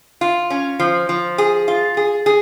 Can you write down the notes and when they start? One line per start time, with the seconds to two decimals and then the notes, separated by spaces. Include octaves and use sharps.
0.21 F4
0.50 C#4
0.80 F3
1.09 F3
1.38 G#4
1.68 F4
1.97 G#4
2.26 G#4